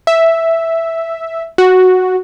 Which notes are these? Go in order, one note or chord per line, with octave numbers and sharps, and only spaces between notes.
E5
F#4